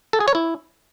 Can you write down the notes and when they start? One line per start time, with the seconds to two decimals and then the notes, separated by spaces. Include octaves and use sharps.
0.13 A4
0.20 G#4
0.28 C#5
0.35 E4